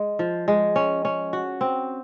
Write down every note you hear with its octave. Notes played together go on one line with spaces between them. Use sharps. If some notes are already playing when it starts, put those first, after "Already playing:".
Already playing: G#3
F3
G#3
C#4
C#4
F#4
C4